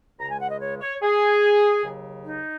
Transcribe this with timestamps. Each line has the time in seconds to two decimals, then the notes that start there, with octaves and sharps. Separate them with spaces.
0.19 C#2 C#3 G#3 A#5
0.30 G#5
0.41 F#5
0.50 D#5
0.61 C#5
0.81 C#5
1.02 G#4
1.84 D#2 C#3 F#3
2.24 D#4